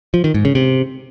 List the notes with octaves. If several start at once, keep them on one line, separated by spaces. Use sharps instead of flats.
F3
D#3
G#2
C#3
C3